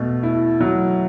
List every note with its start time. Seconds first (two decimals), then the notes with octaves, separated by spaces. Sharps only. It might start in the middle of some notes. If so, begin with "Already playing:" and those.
Already playing: B2 A3
0.23 E4
0.61 F#3